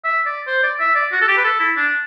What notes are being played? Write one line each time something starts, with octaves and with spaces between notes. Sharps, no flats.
E5
D5
C5
D5
E5
D5
F#4
A4
G4
B4
A4
E4
D4